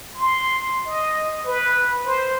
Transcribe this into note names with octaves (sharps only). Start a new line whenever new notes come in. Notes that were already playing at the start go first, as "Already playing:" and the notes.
C6
D#5
B4
C5